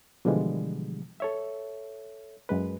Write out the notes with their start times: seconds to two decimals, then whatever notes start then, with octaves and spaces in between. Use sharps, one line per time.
0.25 B2 D3 E3 F3 G3 G#3
1.20 A4 C#5 E5
2.49 F#2 G#3 B4